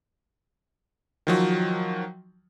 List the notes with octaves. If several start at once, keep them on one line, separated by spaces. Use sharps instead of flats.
D#3 F3 F#3